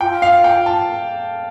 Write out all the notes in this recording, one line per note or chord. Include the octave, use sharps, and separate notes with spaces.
F4 G5
F5
G5
A5